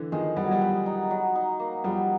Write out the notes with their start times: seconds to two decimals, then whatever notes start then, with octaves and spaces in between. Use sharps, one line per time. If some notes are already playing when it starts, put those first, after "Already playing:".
Already playing: D3 E3
0.12 D#3 F3 G#3
0.36 G3 B3
0.44 F#3
0.51 F3 G3
0.61 B3
0.86 D#4
1.11 F#3
1.35 D#4
1.60 A#3
1.84 F3 G3 B3